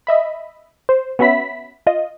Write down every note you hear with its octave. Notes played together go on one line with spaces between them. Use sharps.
D#5 E5 B5
C5
B3 C#4 F#4 E5 B5 B6
F4 D#5